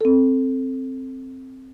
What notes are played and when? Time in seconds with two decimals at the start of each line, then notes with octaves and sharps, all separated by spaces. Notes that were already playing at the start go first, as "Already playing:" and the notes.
0.01 C4 A4